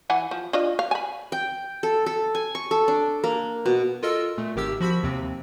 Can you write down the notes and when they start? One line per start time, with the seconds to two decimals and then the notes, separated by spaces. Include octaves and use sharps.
0.10 E3 F#5 G#5
0.31 F3
0.53 D4 F4 D#5
0.79 F5
0.91 G#5 B5
1.32 G5
1.83 A4
2.06 A4
2.35 G#5
2.55 C#6
2.71 A4
2.88 D4
3.24 A#3
3.66 B2
4.03 F4 A4 A#4 D#5 E6
4.38 A#2 A3
4.56 G#1 D#3 G4 E6
4.80 F3 F#4 B5 E6 B6
5.03 D#2 C3 C4